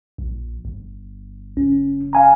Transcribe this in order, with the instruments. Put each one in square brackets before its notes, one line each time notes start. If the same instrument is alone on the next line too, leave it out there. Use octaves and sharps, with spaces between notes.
[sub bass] A#1
G1
[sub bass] F#1 [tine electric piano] C#4
[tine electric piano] F5 G#5 A#5